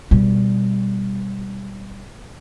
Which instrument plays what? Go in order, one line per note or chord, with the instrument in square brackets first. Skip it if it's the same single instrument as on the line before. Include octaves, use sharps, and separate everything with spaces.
[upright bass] B2 G3